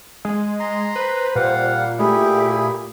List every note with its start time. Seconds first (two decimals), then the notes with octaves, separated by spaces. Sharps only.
0.25 G#3
0.60 A#5 C6
0.96 B4 C5
1.35 A#2 G3 F5 F#5
1.99 A3 E4 G4 G#4